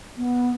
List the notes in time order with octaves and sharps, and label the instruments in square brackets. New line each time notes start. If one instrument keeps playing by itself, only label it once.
[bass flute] B3